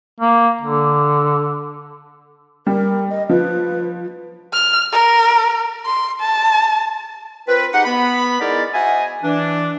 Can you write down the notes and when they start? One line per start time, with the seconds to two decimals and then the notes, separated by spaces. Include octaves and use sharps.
0.20 A#3
0.61 D3
2.67 G3 A#4
3.10 D#5
3.29 F3 B4
4.53 F6
4.92 A#4
5.85 C6
6.20 A5
7.48 C4 F4 A#4 B4
7.73 G#3 D#4 G4 F#5
7.85 B3 B5
8.41 G#3 D#4 E4 A#4 D5
8.74 F#4 C5 D#5 E5 G#5
9.23 E3 D4